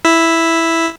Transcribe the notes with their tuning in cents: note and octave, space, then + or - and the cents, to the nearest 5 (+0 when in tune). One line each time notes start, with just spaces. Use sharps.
E4 +0 E5 +0